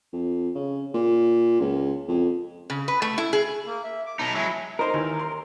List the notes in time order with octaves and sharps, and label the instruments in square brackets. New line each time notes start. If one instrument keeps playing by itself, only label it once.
[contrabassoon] F2
C#3
A#2
C#2
F2
[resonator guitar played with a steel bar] C#3
B4
A3
E4
G#4
[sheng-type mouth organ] A#3
E5
D6
[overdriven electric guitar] B2 D#4 [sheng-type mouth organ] A5
[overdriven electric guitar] F#3 G#3 [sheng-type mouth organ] E4 G#5 B5
[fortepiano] D#4 C5 [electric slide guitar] A#4
[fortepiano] D#2 E3
C6